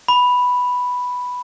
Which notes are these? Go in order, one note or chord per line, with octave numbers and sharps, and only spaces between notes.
B5